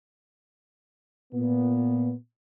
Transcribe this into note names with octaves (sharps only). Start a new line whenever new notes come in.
A#2 B3